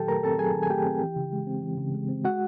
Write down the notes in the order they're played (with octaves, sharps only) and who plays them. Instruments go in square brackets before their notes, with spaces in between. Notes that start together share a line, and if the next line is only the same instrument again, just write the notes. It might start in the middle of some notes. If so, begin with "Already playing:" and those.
Already playing: [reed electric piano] A#2 D#3 F#3 G4 A4 G5 A5
A3 A#4 A#5
C4 A4 A5
F#3 G#4 G#5
D#3
G#5
A3 G4 G5
C4
E3
C#3
G#3
C4
E3
C#3
G#3
C4
G#3 F#4 F#5